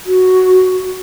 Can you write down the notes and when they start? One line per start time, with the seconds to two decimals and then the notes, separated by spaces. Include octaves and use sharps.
0.06 F#4